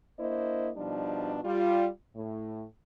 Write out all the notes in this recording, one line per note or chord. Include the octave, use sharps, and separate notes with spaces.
A#3 D4 E4 C5 D#5
B2 F3 G3 D4 D#4
G3 F4
A2